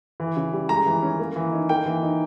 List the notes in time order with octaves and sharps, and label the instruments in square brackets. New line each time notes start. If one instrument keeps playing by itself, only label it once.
[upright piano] E3
C#3
G3
G#3 A#5
E3
C#4
A#3
E3
D#4
A#3 G5
E3
D#4